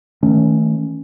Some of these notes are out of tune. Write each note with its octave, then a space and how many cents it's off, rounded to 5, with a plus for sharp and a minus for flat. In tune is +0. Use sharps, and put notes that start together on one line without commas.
D#3 +35 A3 +0 C#4 +0